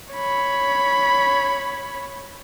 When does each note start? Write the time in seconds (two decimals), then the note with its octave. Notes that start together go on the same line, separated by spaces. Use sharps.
0.13 C#5 B5